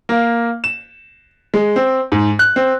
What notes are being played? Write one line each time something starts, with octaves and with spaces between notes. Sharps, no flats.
A#3
E7
G#3
C4
G#2
F#6
C4